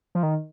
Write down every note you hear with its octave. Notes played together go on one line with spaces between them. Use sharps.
F3
D#3